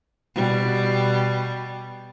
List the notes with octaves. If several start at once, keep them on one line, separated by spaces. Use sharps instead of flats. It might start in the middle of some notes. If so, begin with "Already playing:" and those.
B2 G3